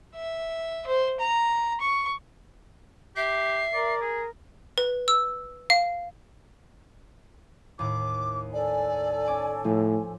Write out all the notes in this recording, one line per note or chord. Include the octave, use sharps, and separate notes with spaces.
E5
C5
A#5
C#6
G4 E5 C7
A#4 D5
G#4
B4
E6
F5
D#2 A2 D6
A4 D5 G#5
C#4 D6
A2 F3